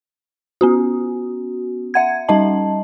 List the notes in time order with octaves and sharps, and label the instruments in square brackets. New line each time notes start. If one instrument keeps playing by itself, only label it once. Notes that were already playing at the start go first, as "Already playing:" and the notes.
[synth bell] B3 C#4 F#4
E5 F#5 G#6
G3 C#4 D#4 D#5 A5